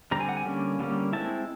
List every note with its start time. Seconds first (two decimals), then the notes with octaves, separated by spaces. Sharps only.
0.11 D3 G3 C4 A#5
0.20 G#5
0.29 F#5
0.37 G#5
0.45 D3 G3 A#3 C#4
0.79 D3 G3 A#3 C#4
1.13 G#3 C4 E4 A5